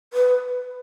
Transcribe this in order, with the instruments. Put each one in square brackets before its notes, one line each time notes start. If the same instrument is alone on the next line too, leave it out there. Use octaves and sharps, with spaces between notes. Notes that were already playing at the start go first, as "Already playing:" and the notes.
[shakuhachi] B4